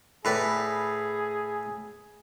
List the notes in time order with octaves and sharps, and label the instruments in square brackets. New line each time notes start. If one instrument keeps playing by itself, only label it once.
[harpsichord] A2 B4 D5 [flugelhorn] G#4